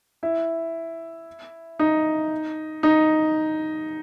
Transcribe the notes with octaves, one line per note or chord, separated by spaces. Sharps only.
E4
D#4
D#4